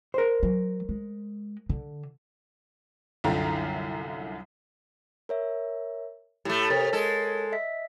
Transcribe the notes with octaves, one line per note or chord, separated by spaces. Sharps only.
A#4 C5
F#3
G#3
D3
C2 F#2 D3 F4 G5 A#5
A#4 C#5 E5
A2 A3 G4
C3 A#4 C#5 B6
G#3 A4
D#5 E5 B6